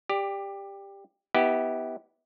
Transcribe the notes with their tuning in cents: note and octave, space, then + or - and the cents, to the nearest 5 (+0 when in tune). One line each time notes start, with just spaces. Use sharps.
G4 +15 D5 +0
B3 +0 E4 -35 G4 -5